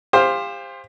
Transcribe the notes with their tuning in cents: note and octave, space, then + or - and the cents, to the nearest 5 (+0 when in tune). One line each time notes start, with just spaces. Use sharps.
G4 +35 C5 +5 F5 +0